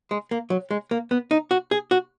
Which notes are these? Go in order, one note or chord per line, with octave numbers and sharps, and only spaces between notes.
G#3
A#3
F#3
G#3
A#3
B3
D#4
F#4
G#4
F#4